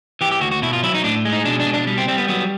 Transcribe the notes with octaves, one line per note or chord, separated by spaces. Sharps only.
E3 G4
G4
D2 F#4
F#4
B2 E4
F4
F#3 E4
D#4
A2 D4
G#3
D#4
B2 D4
D4
B2
D4
G3
C4
G3 C4
B3
F#3 B3